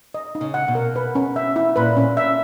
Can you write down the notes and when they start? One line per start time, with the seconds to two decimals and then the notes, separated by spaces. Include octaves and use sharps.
0.14 D#5
0.35 D#4
0.41 C#3
0.54 F#5
0.68 B2
0.75 A#4
0.96 B4
1.15 C#4
1.36 E5
1.56 E4
1.76 A#2 B4
1.97 C#4
2.17 E5